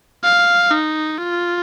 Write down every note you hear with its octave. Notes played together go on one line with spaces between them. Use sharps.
F5
D#4
F4